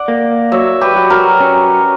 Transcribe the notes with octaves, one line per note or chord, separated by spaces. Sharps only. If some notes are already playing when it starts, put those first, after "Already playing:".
Already playing: D5 F#5
A#3
F#3 C#5 E5
G4 B4
F#3
F#4 A#4
C#4